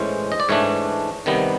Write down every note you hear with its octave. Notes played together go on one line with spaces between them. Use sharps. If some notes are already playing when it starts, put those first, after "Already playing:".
Already playing: A2 E3 G#3 C#4 C5
D#5
D5
G#2 E3 A3 D4 C#5
C3 D#3 G3 B3